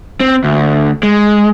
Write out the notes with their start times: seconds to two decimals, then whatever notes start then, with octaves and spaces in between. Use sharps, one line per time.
0.20 C4
0.44 D2
1.03 G#3